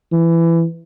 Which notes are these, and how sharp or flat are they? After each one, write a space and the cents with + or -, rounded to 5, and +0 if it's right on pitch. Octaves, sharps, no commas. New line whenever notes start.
E3 +20